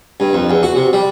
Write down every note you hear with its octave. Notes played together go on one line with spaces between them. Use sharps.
G2
F2
E2
F#4
C3
G3